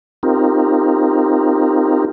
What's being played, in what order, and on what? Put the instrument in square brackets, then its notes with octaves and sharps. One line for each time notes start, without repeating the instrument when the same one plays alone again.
[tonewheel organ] C4 D#4 F4 G4 A#4